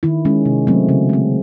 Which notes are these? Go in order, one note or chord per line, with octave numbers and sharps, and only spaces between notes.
D#3 E4
G#3 C#4
C3
F#3 A3 C4
C#3
G#3 C4